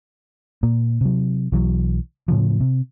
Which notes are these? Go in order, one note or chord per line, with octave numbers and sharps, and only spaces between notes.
A#2 A#3
C3 F#3
B1 E3 F#3
A2 C#3 F3
C3